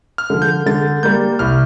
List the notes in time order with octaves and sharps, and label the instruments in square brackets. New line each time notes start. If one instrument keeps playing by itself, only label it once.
[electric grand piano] F6
[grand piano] D3 F3
[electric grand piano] G6
[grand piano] D3 [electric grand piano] A6
[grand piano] G3 A#3 [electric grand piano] G6
[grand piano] C2 [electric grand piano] F6